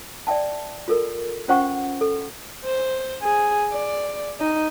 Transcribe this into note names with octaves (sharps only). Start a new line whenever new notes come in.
D5 E5 G5 A5
F4 A4 A#4
C#4 F4 C5 F#5 G5 C#6
A4
C5
G#4
D5
D#4